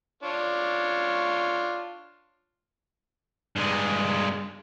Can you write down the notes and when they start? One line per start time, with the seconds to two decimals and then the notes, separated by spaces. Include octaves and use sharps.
0.23 D4 F4 C#5
3.56 G2 G#3